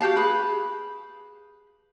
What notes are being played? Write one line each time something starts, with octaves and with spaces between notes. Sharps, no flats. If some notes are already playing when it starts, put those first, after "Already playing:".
F#4 G4 F5 A5
G#4 B4 B5